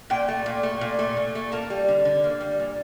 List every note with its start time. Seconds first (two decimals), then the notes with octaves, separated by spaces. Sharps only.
0.10 A#2 G5
0.28 A3
0.46 A#2
0.63 A3
0.81 A#2
0.99 A3
1.17 A#2
1.35 A3
1.52 A#3 A5
1.70 G3
1.88 D3
2.05 D3
2.24 A#3
2.41 G3
2.59 A#2